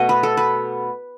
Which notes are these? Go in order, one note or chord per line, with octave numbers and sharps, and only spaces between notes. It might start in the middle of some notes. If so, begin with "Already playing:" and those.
Already playing: B2 A3 D#5 F#5
B4
A4
B4